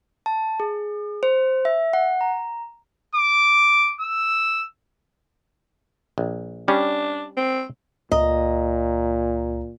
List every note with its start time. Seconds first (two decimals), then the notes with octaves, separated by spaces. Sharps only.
0.26 A5
0.60 G#4
1.23 C5
1.65 E5
1.93 F#5
2.21 A#5
3.15 D6
4.01 E6
6.18 A#1
6.68 G3 C#4 D4
7.37 C4
8.12 C#2 A#2 D#5 A#5